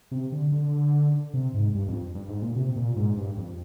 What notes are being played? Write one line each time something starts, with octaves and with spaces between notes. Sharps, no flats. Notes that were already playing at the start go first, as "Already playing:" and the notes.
C3
D3
D3
C3
G#2
G2
F2
G2
G#2
A#2
C3
A#2
G#2
G2
F2